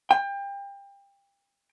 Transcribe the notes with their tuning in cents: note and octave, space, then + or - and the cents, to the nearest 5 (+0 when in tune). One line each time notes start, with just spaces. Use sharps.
G5 +30